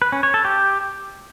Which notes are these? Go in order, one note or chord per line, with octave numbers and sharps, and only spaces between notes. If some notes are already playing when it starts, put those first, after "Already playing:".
B4
C#4
C#5
A4
G4